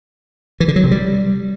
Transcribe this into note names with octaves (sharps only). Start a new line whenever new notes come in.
E3
D3
F#3
C3
G3